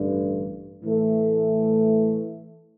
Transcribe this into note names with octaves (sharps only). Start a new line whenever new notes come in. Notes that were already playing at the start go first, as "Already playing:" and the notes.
Already playing: A1 G2 D3
A2 E3 A3